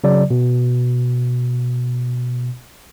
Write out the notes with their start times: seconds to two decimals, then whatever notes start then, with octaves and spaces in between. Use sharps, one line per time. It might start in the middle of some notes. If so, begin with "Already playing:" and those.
0.04 C#3 F#3 D5
0.31 B2